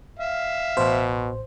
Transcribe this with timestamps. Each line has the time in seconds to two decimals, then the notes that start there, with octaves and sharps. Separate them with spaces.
0.19 E5 F5
0.77 A1 B2 C5